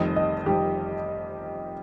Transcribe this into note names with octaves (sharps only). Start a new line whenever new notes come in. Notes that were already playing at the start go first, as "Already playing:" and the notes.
Already playing: F1 F2 D#3 G3 D#5
D#5
F1 F2 D#3 G3 G4